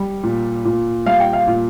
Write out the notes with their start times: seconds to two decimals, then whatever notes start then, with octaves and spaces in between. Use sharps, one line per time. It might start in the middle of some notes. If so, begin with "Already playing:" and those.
Already playing: G3
0.24 A#2
0.65 A#2
1.06 G3 F5
1.20 G5
1.33 F5
1.47 A#2